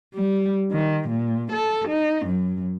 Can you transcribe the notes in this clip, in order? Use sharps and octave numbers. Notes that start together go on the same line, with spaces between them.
G3
D#3
A#2
A4
D#4
F#2